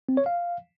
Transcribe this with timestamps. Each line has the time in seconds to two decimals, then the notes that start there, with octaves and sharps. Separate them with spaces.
0.09 C4
0.17 C#5
0.26 F5